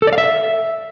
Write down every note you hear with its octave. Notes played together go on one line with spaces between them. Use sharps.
A4
D5
F5
E5